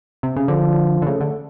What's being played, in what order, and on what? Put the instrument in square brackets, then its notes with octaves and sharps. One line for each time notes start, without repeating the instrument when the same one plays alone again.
[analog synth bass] C3
C#3
[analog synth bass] D3 [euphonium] F3
[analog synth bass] D3
[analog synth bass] C#3 [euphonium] A3
[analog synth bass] D3